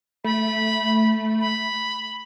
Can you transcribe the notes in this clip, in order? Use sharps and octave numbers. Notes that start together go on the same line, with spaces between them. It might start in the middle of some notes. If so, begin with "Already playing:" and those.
A3 B5
B5